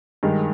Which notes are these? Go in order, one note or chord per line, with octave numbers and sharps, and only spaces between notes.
G2 D#3 G#3